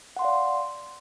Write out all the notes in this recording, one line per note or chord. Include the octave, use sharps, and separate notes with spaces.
D5 F5 F#5 C6